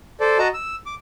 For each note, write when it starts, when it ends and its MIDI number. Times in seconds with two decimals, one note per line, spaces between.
0.20 0.38 69
0.20 0.38 72
0.20 0.38 74
0.39 0.48 66
0.39 0.48 75
0.39 0.48 81
0.39 0.48 82
0.54 0.75 88
0.86 0.95 86